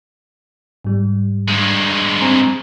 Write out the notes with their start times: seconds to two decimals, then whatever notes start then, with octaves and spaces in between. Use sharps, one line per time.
0.85 G#2 G3
1.48 G2 G#3
2.19 C4 G#5 A#5